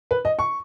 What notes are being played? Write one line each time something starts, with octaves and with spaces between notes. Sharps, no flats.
B4
D#5
C#6